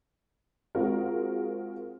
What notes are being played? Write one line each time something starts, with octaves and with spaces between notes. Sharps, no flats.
G#3 C4 F4 F#4 A#4